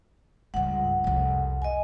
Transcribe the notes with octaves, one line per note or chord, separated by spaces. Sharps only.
C#2 G2 F#5
C2 F2
D#5 G#5